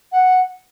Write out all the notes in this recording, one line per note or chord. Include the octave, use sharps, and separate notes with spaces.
F#5